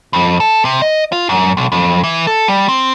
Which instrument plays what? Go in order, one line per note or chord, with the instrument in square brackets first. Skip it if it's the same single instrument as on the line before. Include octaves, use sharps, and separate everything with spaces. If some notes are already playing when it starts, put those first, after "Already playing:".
[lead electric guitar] F2
A4
C3
D#5
F4
F#2
B1
F2
E3
A4
G3
C4